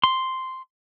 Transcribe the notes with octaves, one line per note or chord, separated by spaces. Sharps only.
C6